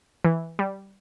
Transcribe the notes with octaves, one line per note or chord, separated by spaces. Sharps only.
E3
G3